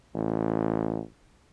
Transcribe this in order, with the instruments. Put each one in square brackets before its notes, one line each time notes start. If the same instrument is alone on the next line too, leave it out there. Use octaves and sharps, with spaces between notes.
[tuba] A1